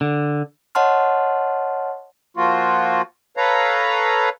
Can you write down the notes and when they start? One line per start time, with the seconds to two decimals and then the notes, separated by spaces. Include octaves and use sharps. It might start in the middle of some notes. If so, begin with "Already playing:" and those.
0.01 D3
0.75 C#5 D#5 F#5 A5 C6 F6
2.37 F3 A#3 F4 F#4
3.37 A4 B4 C#5 F5 A#5